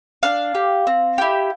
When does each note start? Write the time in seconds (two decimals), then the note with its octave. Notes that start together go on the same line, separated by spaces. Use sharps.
0.23 D4 F5
0.55 G4
0.87 C4
1.18 E4 G4